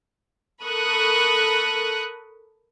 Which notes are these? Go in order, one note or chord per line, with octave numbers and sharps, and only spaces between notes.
A4 A#4 B5 C#6 D#6 F#6